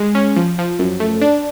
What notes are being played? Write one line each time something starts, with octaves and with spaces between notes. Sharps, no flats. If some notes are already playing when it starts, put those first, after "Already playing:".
Already playing: G#3
C#4
F3
F3
F#2
A3
D4